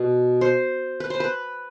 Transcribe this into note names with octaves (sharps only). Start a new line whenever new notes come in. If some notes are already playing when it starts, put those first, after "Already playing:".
Already playing: B2
C5
B4
C5
B4